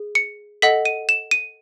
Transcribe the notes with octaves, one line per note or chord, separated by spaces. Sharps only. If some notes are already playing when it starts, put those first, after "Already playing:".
Already playing: G#4
C#7
A4 D#5 F#5 B6
D#7
E7
D#7